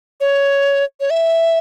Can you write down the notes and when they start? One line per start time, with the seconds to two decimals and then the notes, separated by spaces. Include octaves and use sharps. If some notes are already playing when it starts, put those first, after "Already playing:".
0.21 C#5
1.00 C#5
1.10 E5